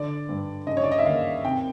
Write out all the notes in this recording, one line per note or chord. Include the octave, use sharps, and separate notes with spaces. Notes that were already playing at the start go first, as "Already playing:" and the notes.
Already playing: D3 D5
G2
C#3 D#5
C#5
D5
D#5
E5
D#2 F5
C3 G5